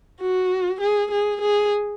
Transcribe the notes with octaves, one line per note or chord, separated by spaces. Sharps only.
F#4
G#4
G#4
G#4